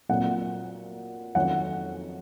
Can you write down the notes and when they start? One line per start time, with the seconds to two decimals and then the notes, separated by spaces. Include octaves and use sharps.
0.09 A#2 F#3 C4 F#5
1.35 F2 D#3 F#3 C#4 F#5